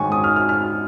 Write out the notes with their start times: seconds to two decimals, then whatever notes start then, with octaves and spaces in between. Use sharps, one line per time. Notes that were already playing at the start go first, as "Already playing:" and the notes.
Already playing: G#2 D#3 G#3 C#4 G#5 C#6
0.12 D#6
0.24 F6
0.36 F6
0.49 F6